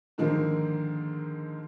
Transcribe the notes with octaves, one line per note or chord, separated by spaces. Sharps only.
G#2 D3 D#3 F3 A#3